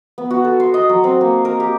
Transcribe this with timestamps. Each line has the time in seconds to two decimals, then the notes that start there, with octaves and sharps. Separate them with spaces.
0.18 B3
0.31 F#4
0.44 A4
0.60 C6
0.74 D#5
0.89 F#3
1.04 C4
1.21 A#3
1.45 A#4
1.60 G4